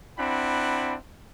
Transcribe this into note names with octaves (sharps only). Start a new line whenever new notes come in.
C4 D4 E4 F#5 B5